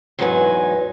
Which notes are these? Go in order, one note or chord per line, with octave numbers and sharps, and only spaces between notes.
E2 G#2 F#3 D#4 B4 G#5